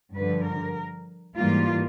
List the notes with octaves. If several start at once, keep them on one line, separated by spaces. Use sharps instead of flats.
G2 D3 F3 B4
A#4
G#2 E3 G3 A#3 F4